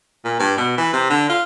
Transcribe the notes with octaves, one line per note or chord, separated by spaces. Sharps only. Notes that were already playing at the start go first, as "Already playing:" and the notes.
A#2
G2
B2
E3
C3
D3
F4